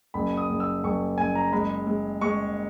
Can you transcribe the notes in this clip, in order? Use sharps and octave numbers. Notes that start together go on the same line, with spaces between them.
F#1 B5
D#6
F#1
E6
F#1 C#6
F#1 G#5
A#5
G#3 B5
G#3
G#3 C#6